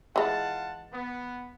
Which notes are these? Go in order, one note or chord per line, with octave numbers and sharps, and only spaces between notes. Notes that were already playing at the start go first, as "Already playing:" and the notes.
E3 G#3 F4 F#5 A5
B3